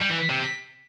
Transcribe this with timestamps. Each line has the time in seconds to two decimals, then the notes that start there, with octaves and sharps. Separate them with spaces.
0.02 G3
0.11 E3
0.30 C3